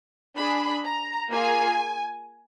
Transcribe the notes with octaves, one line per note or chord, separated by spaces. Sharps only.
D4 G#4 B5
A#5
A#3 F4 G#4 G#5